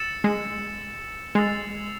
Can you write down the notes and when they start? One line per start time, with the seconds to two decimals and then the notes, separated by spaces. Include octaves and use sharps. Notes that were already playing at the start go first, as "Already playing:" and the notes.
Already playing: E6 A6 C#7 E7
0.24 G#3
1.35 G#3 E6 A6 C7 F7